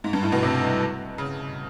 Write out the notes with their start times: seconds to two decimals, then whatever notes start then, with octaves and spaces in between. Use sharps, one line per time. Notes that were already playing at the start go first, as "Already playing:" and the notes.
0.04 G#2
0.13 G2
0.23 A2
0.32 B2
0.43 C3
1.18 C#3